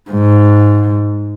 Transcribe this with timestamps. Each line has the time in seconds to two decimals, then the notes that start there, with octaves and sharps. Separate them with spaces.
0.10 G#2